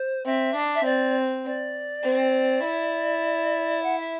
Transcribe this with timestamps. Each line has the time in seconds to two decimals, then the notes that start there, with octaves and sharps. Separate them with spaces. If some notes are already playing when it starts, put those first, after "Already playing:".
Already playing: C5
0.25 C4 E5
0.55 D4
0.75 E5
0.85 C4 D5
1.45 D5
2.04 C4
2.64 E4
3.83 F#5
3.98 E5